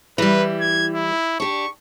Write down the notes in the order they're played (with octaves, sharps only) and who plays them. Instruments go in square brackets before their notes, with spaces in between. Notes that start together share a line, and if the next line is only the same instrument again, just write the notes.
[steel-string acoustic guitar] E3 G3 [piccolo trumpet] B4
[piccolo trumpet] G#6
E4
[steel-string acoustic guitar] D4 G4 [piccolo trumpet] C#6